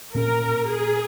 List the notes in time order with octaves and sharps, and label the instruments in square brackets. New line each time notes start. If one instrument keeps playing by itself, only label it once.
[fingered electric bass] A#2 A#3 C#4 [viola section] A#4
[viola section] G#4